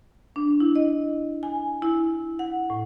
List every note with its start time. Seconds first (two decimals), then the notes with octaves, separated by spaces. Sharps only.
0.36 D4
0.60 E4
0.76 D#5
1.43 G#5
1.82 E4
2.39 F#5
2.70 A2